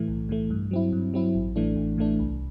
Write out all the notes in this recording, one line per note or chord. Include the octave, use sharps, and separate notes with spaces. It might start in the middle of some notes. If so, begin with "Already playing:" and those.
Already playing: A2 E3 A3
B1
A2 E3 A3
G2
F#3 C4 E4
G2
F#3 C4 E4
A1
A2 E3 A3 D4
A1
A2 E3 A3 D4
C2